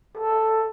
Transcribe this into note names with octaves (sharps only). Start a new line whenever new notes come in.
A4